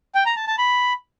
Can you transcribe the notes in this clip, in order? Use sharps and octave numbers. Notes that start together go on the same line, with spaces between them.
G5
A#5
A5
A5
B5